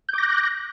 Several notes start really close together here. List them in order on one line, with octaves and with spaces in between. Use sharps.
G6 D6 A#6 F#6